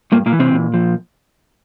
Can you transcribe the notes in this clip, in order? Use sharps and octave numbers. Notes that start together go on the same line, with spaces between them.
G2 A#2 A#3
A#2 A#3
E3
C3 C4
A#2
F3